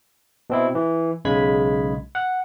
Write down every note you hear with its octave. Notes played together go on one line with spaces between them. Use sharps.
B2 C4 E4
E3
B1 C#3 G#3 B5 G#6 B6
F#5